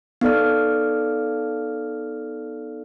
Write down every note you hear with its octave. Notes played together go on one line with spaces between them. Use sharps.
B3 D#4 A4 D5 F6